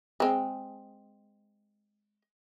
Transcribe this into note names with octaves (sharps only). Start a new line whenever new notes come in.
G#3 C4